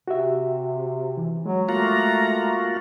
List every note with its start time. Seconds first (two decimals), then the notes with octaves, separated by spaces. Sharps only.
0.08 C3 F#4 G4 E5
1.17 E3
1.46 F#3 G#3
1.69 A3 A#3 F4 F#4 A#5